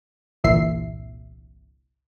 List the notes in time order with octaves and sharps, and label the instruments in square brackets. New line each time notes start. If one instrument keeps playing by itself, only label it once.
[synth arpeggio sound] G1 C2 A#2 E3 E5 C7